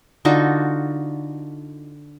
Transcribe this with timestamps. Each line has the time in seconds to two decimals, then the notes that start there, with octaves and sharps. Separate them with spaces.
0.25 D3 D#4 F4 F#4